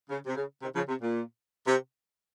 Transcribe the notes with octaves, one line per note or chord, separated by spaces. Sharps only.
C#3
C3
C#3
C3 D#3
C#3 F3
C3
A#2
C3